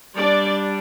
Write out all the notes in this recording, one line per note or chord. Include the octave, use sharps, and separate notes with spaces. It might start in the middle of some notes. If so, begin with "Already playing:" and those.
G3 D4 D5